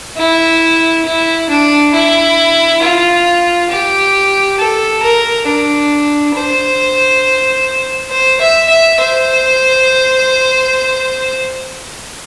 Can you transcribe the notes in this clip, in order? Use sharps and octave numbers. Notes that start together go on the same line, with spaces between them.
E4
E4
D4
E4
F4
G4
A4
A#4
D4
C5
C5
E5
E5
C5